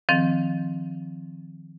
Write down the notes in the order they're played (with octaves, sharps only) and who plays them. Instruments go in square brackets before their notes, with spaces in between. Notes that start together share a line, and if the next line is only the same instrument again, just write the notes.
[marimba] D#3 F3 C4